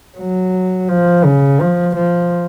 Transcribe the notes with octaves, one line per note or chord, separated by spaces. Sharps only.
F#3
F3
C#3
F3
F3